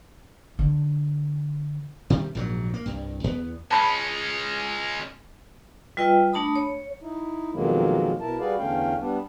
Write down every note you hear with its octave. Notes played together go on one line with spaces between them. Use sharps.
D3
C3 D#3 G3
A#1 G#2 D#3 F#3
A#3
C2 G2
E2 B3
G#3 C#4 A5 B5
G3 F4 B4 D#5 G5 E6
A3 D4 A5 B5 D#6
C#5
D#4 E4
F2 B2 D#3 F#3 G#3 A#3
B2 E4 A#4 A5
G3 F#4 G#4 B4 D5 F5
E2 D3 A3 C#4 F5 G5
G3 B3 D4